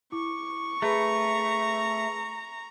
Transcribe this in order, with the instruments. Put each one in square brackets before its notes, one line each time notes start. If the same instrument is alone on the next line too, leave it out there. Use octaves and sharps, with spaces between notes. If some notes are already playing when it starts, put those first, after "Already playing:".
[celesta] E4 D6 [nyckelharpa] C#6
[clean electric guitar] A3 [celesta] G#4 B4 B5 [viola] A#5